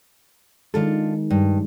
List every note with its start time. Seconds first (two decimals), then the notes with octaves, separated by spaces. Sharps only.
0.74 D#3 G#3 D4 F4 A4
1.30 G2